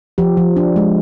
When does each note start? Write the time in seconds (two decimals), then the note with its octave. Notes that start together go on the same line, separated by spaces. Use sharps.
0.18 F3 G4
0.37 F3
0.56 D4
0.76 G#3